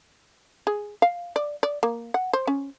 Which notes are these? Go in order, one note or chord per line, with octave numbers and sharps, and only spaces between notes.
G#4
F5
D5
D5
A#3
F#5
C5
C#4